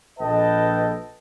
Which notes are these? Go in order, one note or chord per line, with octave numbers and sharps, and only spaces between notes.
A#1 A4 B4 D#5 G5 A5